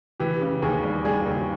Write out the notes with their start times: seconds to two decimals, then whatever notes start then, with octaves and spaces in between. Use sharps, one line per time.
0.20 E3 G4
0.41 C#3
0.62 D#2 G#4
0.84 G3
1.05 G3 G#4
1.26 D#2